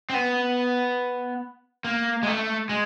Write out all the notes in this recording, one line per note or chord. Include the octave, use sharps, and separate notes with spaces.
C4
B3
A#3
G#3
A3
G#3